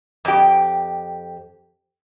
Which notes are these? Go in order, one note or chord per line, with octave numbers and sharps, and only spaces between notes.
F2 G4